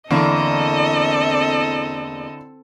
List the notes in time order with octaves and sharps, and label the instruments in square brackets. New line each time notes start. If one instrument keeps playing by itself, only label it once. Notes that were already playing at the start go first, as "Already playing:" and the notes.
[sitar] E2 A#3 [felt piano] D3 D4 E4 [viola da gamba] C4 A4 [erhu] D#5